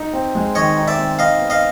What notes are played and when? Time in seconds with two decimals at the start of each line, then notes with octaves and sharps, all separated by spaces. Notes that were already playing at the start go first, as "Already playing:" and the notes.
Already playing: D#4
0.13 C4
0.35 G#3
0.55 D#3 C#5 D#5
0.77 D#4
0.88 D5 E5
0.98 C4
1.19 D#4 D#5 F5
1.40 B3
1.50 D#5 F5